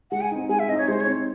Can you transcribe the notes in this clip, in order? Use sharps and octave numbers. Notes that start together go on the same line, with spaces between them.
G#3 F#5
G#5
C4 D#4
G#3 G#5
E5
C4 D#4 D#5
C#5
G#3 C5
C#5
C4 D#4